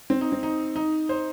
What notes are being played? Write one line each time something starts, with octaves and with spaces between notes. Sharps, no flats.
C4
D#4
C4
D#4
D#4
C5